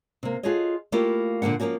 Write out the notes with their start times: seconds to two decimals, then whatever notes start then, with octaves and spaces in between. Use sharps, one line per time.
0.23 C3 A#3
0.43 F4 F#4 G#4 A4 C#5 D#5
0.92 A3 A#3 E4 F4 G4
1.42 A#2 D3 F3 A#3 F#5
1.60 F3 F#3 A#3 C#4 F#4